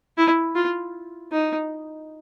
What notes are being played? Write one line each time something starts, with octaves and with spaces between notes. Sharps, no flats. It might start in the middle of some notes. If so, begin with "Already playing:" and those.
E4
F4
D#4